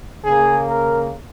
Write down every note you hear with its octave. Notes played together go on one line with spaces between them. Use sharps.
C#3 A#3 G#4
A#4